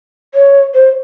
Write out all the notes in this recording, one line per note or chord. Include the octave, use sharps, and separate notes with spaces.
C#5
C5